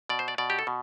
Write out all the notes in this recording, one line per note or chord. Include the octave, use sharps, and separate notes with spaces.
B2 D5
C5
D5
B2 D5
G4
A4
B2